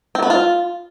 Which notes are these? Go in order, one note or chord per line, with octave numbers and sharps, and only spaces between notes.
C4
B3
F4